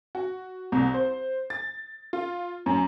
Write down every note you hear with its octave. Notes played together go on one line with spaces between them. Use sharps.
F#4
C2
C5
A6
F4
F#2